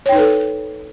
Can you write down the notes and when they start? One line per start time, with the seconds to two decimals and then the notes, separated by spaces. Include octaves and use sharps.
0.06 C#5
0.09 G5
0.12 D#4
0.15 B4
0.19 A4